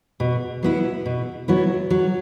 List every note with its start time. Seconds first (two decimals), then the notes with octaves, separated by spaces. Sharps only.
0.20 B2
0.63 F#3 B3 E4
1.06 B2
1.48 F#3 B3 E4
1.90 F#3